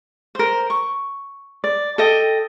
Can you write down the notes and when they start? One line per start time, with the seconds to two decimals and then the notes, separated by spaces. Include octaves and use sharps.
0.35 A#4 C5
0.70 C#6
1.64 D5
1.98 A4 D#5 G5